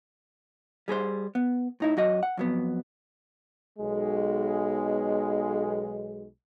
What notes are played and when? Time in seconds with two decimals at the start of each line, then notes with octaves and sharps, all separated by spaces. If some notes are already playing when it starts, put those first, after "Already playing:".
0.88 G3 G#4 A#4 C5
1.35 B3
1.80 A2 D#4 E4
1.97 F#2 F#4 D#5
2.23 F#5
2.37 F2 F#3 B3
3.78 B1 G#3